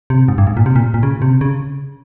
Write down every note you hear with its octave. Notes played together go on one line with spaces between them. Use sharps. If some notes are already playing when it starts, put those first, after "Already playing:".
C3
G#2
G2
G#2
A#2
C3
A#2
A#2
C#3
C3
C#3